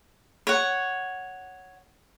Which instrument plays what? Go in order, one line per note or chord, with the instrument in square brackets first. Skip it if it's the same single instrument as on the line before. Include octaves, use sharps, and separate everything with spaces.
[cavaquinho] C#5 F#5